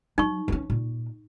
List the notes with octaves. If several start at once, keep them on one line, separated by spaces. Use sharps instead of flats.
F#3 D#4 C#6
E3 C#4
A#2